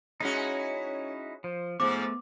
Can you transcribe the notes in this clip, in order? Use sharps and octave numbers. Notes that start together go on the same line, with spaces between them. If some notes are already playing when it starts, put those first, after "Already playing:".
G#3 C#4 D#4 E4 F#4 C#5
F3 C5
G#2 F3 A3 B3 D6